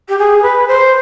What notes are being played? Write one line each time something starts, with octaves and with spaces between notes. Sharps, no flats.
G4
G#4
B4
C5